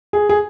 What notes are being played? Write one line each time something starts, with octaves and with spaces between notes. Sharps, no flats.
G#4
G#4